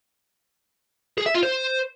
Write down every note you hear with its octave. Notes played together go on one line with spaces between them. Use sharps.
G#4
E5
F4
C5